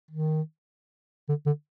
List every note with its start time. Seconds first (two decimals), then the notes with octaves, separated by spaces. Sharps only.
0.11 D#3
1.29 D3
1.46 D3